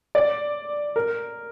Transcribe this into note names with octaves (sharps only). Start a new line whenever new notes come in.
D5
A#4